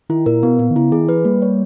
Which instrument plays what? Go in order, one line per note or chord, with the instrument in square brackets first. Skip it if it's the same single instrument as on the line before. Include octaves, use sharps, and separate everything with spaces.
[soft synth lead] D#3 [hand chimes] E4
[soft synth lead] A#2 [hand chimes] A#4
[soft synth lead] B2 [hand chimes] B3
[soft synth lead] A#2 [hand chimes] B3
[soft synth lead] D#3
[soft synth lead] C#3 [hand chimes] E4
[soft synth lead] D#3 [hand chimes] G#4
[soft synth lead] E3 [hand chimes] B4
[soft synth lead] G3 [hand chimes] A#3
[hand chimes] C#5